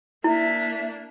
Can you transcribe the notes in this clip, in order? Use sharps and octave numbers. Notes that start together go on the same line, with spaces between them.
A#3 D4 E4 E5